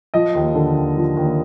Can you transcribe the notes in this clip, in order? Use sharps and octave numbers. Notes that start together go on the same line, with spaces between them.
F3 D#5
D#2
D3
D#2
F3
D#2